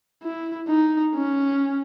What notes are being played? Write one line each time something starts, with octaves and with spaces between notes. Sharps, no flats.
E4
D#4
C#4